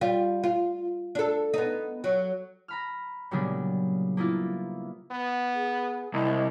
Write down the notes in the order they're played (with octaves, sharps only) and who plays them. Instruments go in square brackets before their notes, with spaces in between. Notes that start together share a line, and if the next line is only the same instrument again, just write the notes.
[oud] G3 F4
F4
D4 A4
B3 D#4
F#3
[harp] A#5 B5 F6
A#2 C#3 F#3 G3 B3 D4
A#3 B3 E4 F4
[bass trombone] B3
[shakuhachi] G#4
[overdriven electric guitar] C2 [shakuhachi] D#5